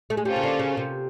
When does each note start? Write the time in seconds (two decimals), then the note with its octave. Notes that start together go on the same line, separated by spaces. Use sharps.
0.10 A3
0.17 G#3
0.25 G3 A#3 C#4 F4 A4 C5
0.36 C#3
0.43 D3
0.59 C#3
0.77 C3